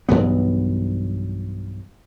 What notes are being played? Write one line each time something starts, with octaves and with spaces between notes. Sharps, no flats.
B1 G2 E3 B3